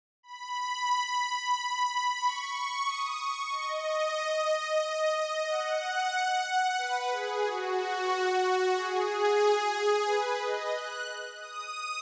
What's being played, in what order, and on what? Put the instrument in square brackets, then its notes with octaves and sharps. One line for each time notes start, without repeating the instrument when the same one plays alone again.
[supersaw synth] B5
C#6
D#6
C#6
D#5
F#5
B4
G#4
F#4
G#4
B4
D#5
F#6
D#6